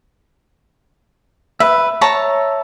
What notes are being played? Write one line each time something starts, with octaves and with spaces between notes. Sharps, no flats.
B4 E5
C#5 A5 A#5